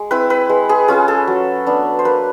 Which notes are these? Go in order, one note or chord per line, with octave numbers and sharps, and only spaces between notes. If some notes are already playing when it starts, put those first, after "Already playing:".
Already playing: G#3
C4 E4 B4
B4
G#3
G#4
C#4 F4 G#4
A4
F#3
B3 D4
C5
A#3 B4